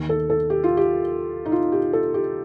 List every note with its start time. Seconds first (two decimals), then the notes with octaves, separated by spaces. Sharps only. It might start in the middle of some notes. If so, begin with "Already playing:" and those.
Already playing: D#2 D#3
0.09 A4
0.30 A4
0.50 G4
0.64 F4
0.77 G4
1.45 D#4
1.52 F4
1.72 G4
1.93 A4
2.14 G4